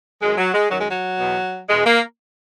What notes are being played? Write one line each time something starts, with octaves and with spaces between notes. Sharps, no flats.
F#2 D#3 G#3
F#3
G#3
F#2 D#3 F#3
G#3
F#3
E2 B2
E2 B2 G#3
A#3